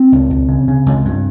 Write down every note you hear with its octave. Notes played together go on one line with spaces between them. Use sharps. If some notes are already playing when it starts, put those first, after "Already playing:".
Already playing: C4
C#2
C#2
C#3
C#3
C#2
G2